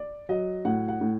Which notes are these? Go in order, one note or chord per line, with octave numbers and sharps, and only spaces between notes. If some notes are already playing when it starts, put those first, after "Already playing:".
Already playing: D5
F#3 D#5
A2 F#5
F#5
A2